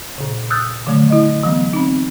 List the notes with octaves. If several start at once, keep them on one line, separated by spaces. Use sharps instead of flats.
A#2 C#3
D#6 E6 F#6 G6 A6
D3 D#3 F#3 A3
E4 D#5
E3 F#3 B3
C4 D#4